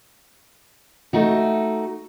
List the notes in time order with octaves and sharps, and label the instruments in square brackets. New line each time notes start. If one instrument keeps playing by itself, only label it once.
[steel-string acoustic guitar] A3 D#4 F#4